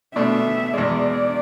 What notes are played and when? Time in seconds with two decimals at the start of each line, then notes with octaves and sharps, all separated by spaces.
0.16 B2 A3 D4 E5
0.73 E2 B2 G#3 D5